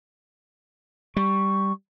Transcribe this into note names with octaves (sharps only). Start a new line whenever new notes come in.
G3 C#6